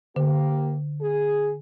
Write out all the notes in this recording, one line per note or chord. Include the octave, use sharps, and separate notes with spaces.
D3 A#3 G4
G#4